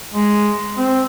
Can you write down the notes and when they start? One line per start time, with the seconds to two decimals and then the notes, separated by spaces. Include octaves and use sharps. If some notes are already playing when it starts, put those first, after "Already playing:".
0.14 G#3
0.78 C4